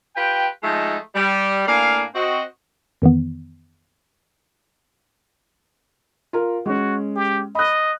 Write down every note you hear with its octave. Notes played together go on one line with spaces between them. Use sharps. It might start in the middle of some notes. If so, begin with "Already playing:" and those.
F4 G4 B4 G5
F3 G#3 A3 D#4
G3
A2 A#3 D4 F5 G#5
C4 F#4 D#5
F2 D#3 E3 B3
F4 A#4
G#3 C#4 F#4
G4
D#5 B5 F#6